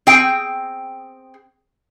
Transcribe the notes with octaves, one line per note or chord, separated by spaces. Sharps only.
C4 G#4 G5